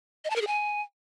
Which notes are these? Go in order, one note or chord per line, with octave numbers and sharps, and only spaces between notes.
D#5
A5
A#4
G#4
G#5